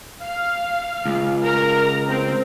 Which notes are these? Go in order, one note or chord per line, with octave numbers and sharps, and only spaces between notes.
F5
C#2
A#4 A#5
C4